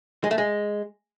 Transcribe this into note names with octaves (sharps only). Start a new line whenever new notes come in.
G#3
A3
G#3